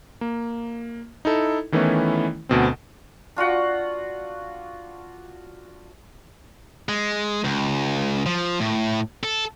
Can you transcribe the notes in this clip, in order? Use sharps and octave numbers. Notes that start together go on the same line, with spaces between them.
A#3
D#4 E4 A4
D#3 E3 A3 B3 C#4 E4
D2 B2 C4
D4 F4 F#4 F#5
G#3
C#2
F3
A2
A4